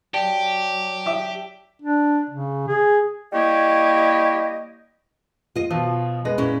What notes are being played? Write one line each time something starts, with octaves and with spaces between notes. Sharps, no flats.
F#3 G4 D5 G5 A5
E5 D6
D4
C#3
G#4
G3 A#3 E4 G4 C#5 D#5
F4 D#5
B2 F3 F4
G#3 B3 D#5
A#2 C#4 E4